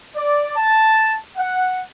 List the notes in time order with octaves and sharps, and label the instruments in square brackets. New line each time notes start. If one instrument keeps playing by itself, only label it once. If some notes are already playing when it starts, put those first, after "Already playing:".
[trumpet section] D5
A5
F#5